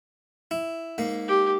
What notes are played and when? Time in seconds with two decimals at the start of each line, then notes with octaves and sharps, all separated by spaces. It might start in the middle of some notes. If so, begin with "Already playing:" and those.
0.51 E4
0.98 G#2 A#3
1.28 G4